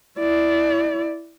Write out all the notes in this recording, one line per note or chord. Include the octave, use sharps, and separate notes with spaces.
E4 D5